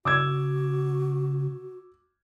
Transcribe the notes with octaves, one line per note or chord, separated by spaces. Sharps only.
C#3 F#4 D6 E6 G#6